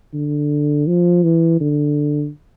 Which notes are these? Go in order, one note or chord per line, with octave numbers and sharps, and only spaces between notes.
D3
F3
E3
D3